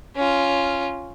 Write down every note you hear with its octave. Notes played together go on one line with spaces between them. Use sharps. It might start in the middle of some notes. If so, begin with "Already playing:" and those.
C#4 F4